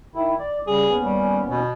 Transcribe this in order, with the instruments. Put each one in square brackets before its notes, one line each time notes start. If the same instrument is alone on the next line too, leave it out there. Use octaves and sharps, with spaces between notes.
[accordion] D#3 E4
D5
[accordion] C#3 G3 [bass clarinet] G#4
[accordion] D#2 B3 C#4
[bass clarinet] G3
B2